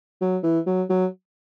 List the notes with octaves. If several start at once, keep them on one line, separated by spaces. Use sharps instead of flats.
F#3
E3
F#3
F#3